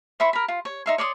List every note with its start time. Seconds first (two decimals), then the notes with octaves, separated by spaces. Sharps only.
0.20 C5 E5 B5 C#6
0.33 A#4 B5
0.48 F4
0.65 C#5
0.86 D#4 E5 C6
0.98 C#5 D5 C6 D#6